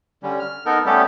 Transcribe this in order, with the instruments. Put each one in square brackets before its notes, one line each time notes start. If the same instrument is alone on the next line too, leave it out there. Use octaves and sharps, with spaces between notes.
[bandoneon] D3 G3 C#4
F6
B3 D#4 A4 A#4
G3 A3 B3 C#4 G4 A4